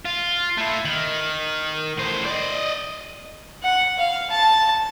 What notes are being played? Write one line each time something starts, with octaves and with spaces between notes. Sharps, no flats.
F4
A3 E4
D#3
A2 C5
D5 D#5
F#5
F5
A5